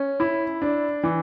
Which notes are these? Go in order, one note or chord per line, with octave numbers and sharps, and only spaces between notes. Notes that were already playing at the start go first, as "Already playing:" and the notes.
Already playing: C#4
E4
D4
E3